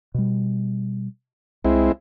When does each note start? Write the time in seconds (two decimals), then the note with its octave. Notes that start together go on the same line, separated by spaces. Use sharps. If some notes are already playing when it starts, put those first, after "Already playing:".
0.14 B2 G3
1.65 C2 G#3 C4 E4